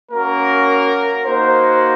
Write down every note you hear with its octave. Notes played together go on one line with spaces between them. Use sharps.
A#3 C#4 F#4 A#4
A#3 D#4 F#4 C5